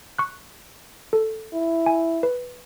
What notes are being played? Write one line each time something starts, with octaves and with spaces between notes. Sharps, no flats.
C#6 F#6
A4
E4
G#5
B4